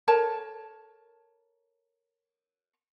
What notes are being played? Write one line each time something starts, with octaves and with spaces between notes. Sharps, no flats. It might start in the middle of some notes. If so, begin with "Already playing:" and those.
A4 A#4 C#5 A5